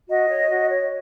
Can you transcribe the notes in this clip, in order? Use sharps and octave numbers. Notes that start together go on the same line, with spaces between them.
F#4 D#5
C#5
F#4
C#5